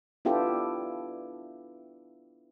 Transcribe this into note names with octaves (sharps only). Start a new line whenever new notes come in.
B3 D4 E4 F4 G4 A4